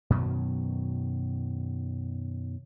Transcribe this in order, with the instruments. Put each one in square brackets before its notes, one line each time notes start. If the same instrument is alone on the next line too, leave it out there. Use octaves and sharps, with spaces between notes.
[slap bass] F#2 B2 D#3 F#3